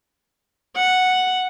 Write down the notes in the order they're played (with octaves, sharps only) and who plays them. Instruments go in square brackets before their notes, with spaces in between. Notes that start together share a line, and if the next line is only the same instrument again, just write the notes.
[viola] F#5